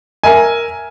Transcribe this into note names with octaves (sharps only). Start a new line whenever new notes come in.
A#4 E5 G#5